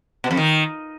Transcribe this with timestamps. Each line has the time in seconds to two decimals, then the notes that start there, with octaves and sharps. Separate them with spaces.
0.24 B2
0.31 F2
0.37 D#3